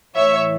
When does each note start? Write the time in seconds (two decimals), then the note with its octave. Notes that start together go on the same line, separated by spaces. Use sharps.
0.15 A2 E3 C#5 E5